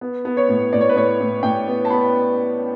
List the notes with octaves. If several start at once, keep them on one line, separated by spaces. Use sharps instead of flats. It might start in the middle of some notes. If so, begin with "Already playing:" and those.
B3
B3
C#5
A2
A2 D5
C#5
B4
A2 C#5
A2
A2 G5
B3
A5
B3 B5